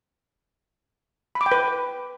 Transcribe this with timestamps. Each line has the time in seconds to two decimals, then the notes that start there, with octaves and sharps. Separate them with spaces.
1.35 B5
1.41 D6
1.46 G5
1.52 B4